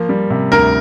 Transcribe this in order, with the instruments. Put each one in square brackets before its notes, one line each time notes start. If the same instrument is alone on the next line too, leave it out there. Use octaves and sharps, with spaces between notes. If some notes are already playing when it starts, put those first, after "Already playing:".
Already playing: [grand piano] F3 A#3
G3
C3
[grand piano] D2 [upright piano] A#4